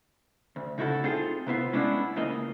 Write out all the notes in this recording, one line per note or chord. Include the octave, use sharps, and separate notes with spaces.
D2
C#3 D#4 E4 F#4 A4
C4 D#4 F4 G#4 A4
C3 B3 E4 F4
G#3 B3 C#4 D4 E4
C#2 C#3 E3 A#3 D#5